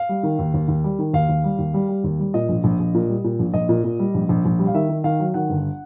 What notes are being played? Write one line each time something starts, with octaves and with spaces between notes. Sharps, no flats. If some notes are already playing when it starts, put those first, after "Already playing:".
Already playing: F5
G3
D#3
D#2
D#2
D#2
G3
D#3
D#2 F5
D#2
G3
D#2
G3
G3
D#2
G3
A#2 D#5
A#1
A#1
A#1
A#2
G3
A#2
A#1
A#1 D#5
A#2
A#2
G3
A#1
A#1
A#1
G3
F5
D#3 E5
D#3
D#3 F5
F#3
D#3 F#5
G1